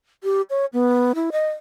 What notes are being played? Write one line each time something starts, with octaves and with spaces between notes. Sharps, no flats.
G4
C#5
B3
E4
D#5